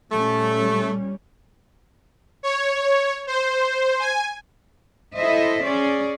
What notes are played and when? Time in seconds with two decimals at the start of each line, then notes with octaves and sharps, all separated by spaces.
0.11 A#2 G3 A3 C#4
2.43 C#5
3.27 C5
4.00 G#5
5.15 E4 A4 C5 D#5 E5
5.64 C#4 G#4 D5